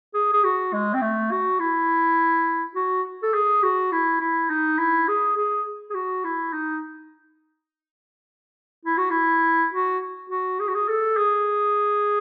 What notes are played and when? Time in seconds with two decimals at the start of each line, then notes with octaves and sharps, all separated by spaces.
0.14 G#4
0.33 G#4
0.44 F#4
0.73 G#3
0.94 C4
1.02 A3
1.31 F#4
1.60 E4
2.76 F#4
3.23 A4
3.34 G#4
3.63 F#4
3.92 E4
4.21 E4
4.50 D#4
4.79 E4
5.08 G#4
5.37 G#4
5.90 G#4
5.95 F#4
6.24 E4
6.53 D#4
8.85 E4
8.98 F#4
9.11 E4
9.73 F#4
10.30 F#4
10.60 G#4
10.68 F#4
10.75 G#4
10.88 A4
11.17 G#4